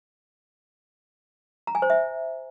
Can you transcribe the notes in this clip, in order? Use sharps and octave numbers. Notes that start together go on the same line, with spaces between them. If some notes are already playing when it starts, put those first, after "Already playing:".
A#5
G#5
C5
E5